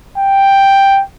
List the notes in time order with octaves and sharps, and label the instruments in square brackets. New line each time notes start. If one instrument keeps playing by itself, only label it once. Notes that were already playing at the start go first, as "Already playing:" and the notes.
[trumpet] G5